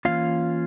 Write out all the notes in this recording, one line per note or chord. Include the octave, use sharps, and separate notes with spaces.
E3 A#3 C#4 F4 F5